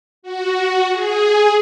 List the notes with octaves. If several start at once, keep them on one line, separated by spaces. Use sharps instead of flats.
F#4
G#4